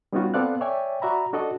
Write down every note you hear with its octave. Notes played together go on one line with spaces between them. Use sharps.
G3 B3 C#4 D#4 F4 F#4
B3 C4 A4 D5 F5 F#6
C#5 D5 E5 G5 G#5
F#4 D5 E5 A#5 B5
D4 F#4 A4 D5 D#5